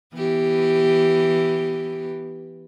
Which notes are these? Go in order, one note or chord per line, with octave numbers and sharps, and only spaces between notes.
E3 B3 G4